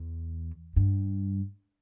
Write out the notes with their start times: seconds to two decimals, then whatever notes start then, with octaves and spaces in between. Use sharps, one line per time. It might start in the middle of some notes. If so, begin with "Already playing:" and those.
Already playing: E2
0.76 G2